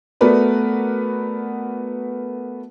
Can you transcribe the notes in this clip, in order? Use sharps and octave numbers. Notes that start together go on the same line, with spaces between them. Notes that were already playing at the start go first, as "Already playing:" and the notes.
A3 B3 F#4 A#4 B4 D5